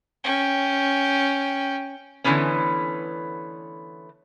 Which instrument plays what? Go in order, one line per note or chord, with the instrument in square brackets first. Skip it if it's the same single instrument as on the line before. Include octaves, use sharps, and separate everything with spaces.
[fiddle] C#4 G5
[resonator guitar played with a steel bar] D3 E3 A3 B3 C#4